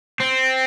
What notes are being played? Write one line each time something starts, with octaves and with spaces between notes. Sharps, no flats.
C4